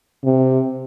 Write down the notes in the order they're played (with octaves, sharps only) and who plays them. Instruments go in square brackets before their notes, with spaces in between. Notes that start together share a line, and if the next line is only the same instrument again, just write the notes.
[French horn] C3